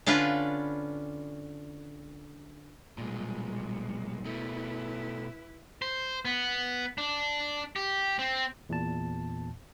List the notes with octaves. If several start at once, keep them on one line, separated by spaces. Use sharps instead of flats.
D3 C#4 D4 F4 B4
B1 A#2 G3 G#3
B2 A3 E4 B4
C5
B3
D4
G4
C4
E2 A#2 A5